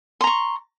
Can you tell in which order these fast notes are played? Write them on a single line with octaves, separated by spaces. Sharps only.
C6 A#5 C#6